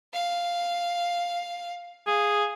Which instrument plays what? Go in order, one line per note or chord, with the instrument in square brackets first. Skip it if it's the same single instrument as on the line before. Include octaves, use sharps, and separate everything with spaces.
[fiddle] F5
[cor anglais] G#4 [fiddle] F5